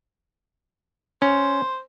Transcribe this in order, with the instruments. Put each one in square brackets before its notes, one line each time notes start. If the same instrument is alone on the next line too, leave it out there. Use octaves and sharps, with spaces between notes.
[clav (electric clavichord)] C#4 [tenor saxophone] C5